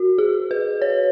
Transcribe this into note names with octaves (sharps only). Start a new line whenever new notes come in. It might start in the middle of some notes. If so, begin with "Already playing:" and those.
Already playing: F#4
G#4
B4
C#5